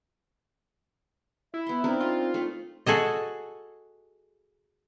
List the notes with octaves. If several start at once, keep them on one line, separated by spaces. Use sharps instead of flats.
E4 E5
B3 C6
C4 D4 D#4 A#4
F4 C6
A3
F#4 G#4 A4 D#5